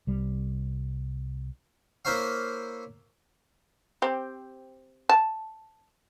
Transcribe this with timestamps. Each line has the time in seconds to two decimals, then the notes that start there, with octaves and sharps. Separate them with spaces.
0.07 C2 G3
2.05 A#3 E4 A#4 C5 C#5 F5
4.02 C4 G4
5.09 A5